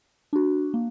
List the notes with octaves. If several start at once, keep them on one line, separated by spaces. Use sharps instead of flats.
D4 F#4
A#3